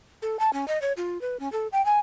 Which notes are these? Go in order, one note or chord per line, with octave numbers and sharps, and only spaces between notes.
A4
A5
C#4
D#5
C#5
F4
B4
C#4
A4
G5
G#5